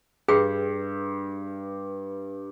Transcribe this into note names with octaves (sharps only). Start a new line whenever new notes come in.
G2 F#4 G#4 G5